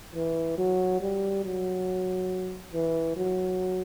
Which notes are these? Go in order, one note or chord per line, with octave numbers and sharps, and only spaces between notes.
E3
F#3
G3
F#3
E3
F#3